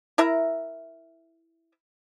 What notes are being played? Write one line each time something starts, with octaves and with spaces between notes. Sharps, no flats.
E4 A#4 E5 A#5